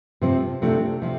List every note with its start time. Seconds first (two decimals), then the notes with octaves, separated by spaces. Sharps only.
0.21 C3 F3 C4
0.62 C3 F3 A3 D4
1.02 C3 F3